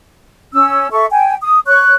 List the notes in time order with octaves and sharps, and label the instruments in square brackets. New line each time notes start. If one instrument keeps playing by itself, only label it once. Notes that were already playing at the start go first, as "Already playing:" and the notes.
[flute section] C#4 E6
A4 E5 C#6
G5 G#5
D#6
C#5 C#6 F#6